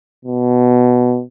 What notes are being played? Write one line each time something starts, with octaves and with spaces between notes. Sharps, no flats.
B2